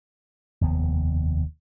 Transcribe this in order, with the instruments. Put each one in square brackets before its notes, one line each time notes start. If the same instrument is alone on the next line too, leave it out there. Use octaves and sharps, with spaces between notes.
[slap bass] F1 D#2 B3